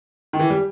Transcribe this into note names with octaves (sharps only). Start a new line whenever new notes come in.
D#3
E3
G3